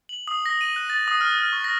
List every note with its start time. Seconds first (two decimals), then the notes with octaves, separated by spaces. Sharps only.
0.09 F#7
0.28 D#6
0.46 A#6
0.61 D#7
0.76 F#6
0.90 A6
1.08 D#6
1.21 F6
1.39 F6
1.52 C#6
1.64 A#6